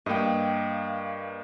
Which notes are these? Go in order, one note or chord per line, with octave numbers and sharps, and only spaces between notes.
G2 A#3 D#5 G5